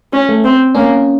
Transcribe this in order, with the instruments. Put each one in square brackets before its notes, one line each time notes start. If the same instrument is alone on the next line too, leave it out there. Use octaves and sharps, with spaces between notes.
[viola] C#4
[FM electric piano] A3
[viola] C4
[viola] A#3 [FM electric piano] C#4